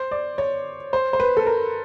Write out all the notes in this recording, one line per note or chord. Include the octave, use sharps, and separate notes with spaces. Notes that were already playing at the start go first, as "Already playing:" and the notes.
Already playing: C5
D5
C#5
C5
C5
B4
A4
A#4